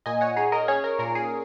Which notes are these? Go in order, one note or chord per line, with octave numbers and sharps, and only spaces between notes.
A#2 D#5 G#5
C#5 F#5
D#4 G#4 C#5
A#4 D#5
C#4 G#4 C#5
A#4
A#2 A#4
G#4